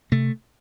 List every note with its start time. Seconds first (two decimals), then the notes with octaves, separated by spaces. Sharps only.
0.12 C3 A3